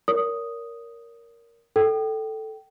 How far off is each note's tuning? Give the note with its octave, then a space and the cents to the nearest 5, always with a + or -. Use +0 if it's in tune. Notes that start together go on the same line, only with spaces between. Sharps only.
A#4 +0 C#5 +35 D#6 +0
A4 +0 G5 -20